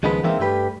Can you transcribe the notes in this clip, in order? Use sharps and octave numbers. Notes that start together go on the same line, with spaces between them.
C#2 D#3 F3 G#3 B3 B4
E3 G#3 A#3 C4 D#4 E5
G2 G3 A3 G4 B4